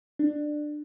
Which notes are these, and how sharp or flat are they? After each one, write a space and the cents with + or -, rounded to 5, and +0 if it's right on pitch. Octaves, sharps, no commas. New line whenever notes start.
D4 +20